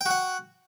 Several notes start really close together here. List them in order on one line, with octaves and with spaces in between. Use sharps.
G5 F#4 F#5